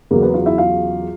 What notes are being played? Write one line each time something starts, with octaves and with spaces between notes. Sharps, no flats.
E2 C#3 F#3 A#3 A#4
B3 B4
F4 F5
E4 E5
F4 F5